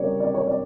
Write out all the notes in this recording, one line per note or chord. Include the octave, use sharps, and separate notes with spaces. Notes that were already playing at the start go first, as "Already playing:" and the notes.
Already playing: C#3 G3 A#3 C#5 D5
D5
C#5
D5